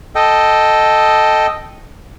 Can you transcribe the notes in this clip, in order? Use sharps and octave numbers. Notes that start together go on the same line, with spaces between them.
A4 D#5 G5